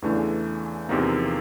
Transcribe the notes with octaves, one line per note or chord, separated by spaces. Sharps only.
E2 C#3 E3 A3 D4
E2 C3 F3 A#3 D#4